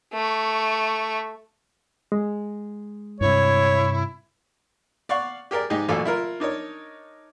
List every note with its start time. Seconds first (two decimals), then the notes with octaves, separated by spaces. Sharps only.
0.13 A3 C#6
2.12 G#3
3.21 G2 C3 E4 C#5
5.09 D5 F5 F#5 C#6
5.51 G4 G#4 A#4 D5
5.70 G#2 D#4 G4 G#4
5.88 A1 A#2 F#3 A4 F5 G#5
6.05 E4 F4 A#4
6.40 D4 D#4 A#4 C#5